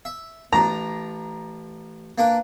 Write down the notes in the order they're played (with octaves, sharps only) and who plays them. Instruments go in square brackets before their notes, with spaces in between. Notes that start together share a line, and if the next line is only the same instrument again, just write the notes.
[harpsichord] E5
[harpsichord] A1 D4 [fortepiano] A#5
[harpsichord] A#3 D4 B4